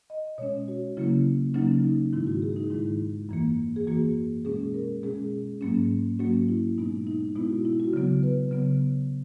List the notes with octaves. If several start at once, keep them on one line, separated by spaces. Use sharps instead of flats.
D#5
B2 G#3 C#4 C#5
F#4
C#3 F#3 A#3 C#4 E4
C#3 F#3 A#3 C#4 D#4
D#4
G#2 D#3 G#3 E4
F#4
G#4
D#4
G#2 D#3 G#3 E4
F#2 E3 A#3
G#4
F#2 E3 A#3 F#4
B2 G#3 C#4 G#4
A#4
B2 G#3 C#4 G#4
G#2 F#3 A#3 C#4
G#2 F#3 A#3 C#4 F#4
E4
B2 G#3 B3 D#4
D#4
B2 G#3 B3 E4
F#4
E4
F#4
C#3 F#3 B3
B4
C#3 F#3 B3